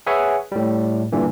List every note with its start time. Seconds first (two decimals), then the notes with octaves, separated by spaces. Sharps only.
0.07 G#4 B4 C#5 E5 F#5 G#5
0.52 A2 G3
1.12 G2 A#2 D3 E3